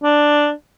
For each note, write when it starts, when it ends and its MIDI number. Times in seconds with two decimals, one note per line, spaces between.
0.03 0.51 62